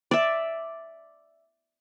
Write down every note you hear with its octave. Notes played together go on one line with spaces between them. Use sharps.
D5 E5